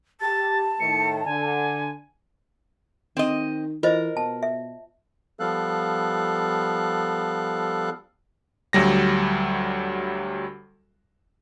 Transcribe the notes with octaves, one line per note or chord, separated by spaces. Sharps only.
G4 A5 A6
A2 D#3 A3 C#7
D3 G#5
D#3 C4 D#5
E3 F4 A#4 C5 D#5
B2 A5
E5
F3 G3 B3 A4 F5 F#6
D2 F#3 G3 A#6